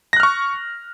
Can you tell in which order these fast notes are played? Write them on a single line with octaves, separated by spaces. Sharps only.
A#6 F#6 F6 C#6